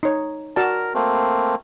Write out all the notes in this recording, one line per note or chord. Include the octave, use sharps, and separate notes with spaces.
D#4 C#5
F#4 A#4 D5 A5
A3 A#3 C4